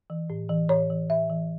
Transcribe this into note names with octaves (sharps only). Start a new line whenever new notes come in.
E3
A2
E3
A2 C#5
E3
A2 E5
E3